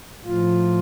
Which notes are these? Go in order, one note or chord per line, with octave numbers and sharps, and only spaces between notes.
A2 F3 F4